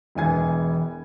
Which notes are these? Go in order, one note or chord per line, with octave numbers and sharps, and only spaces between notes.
E1 E3 G#5 G#6